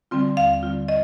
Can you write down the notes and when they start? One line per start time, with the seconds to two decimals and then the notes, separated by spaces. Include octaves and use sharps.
0.11 D3 G3 C4 F4
0.37 D#2 F5
0.63 D3 G3 C4 F4
0.88 D#5